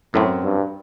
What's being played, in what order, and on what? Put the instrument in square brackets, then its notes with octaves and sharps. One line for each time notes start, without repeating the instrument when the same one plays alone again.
[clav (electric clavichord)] F#2 F#3 C4 [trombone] A2
[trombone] G2